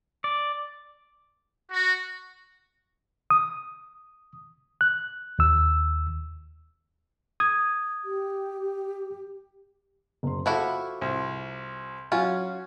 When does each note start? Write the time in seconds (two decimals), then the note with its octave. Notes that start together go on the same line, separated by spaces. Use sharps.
0.24 D5
1.72 F#4
3.30 D#6
4.81 F#6
5.39 D#2 E6
7.40 D#6 G#6
8.05 G4
10.23 F#1 C6
10.46 F3 E4 F#4 A4 D6
11.01 C2
12.12 F#3 C#4 F4 F#4